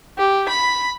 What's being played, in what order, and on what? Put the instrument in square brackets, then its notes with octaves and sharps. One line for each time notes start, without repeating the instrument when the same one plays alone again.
[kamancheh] G4
B5